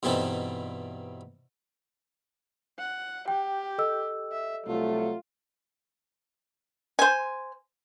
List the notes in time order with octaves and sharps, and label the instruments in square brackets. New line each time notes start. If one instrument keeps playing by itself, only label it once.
[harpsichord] G2 B2 E3 C4 D#4 A4
[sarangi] F#5
[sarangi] G4 [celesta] G5
[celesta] A4 D#5 E6
[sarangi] E5
[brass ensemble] C2 F#3 A3 [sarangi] F4
[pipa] C5 G#5